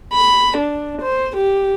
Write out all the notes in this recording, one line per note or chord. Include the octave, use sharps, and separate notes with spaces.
B5
D4
C5
G4